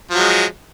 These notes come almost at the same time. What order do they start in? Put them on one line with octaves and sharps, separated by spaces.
F3 F#3 G#3